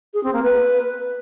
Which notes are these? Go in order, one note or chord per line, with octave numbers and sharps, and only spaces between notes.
G#4
C4
A#3
B4